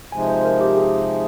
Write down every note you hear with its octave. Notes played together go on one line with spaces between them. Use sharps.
C3 F3 G#3 D#4 G#5
C5
A#4
G4
G#4
G#4